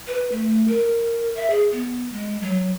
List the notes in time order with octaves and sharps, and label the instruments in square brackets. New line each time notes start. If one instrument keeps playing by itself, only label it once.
[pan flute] B4
A3
A#4
E5
G#4
B3
G#3
F#3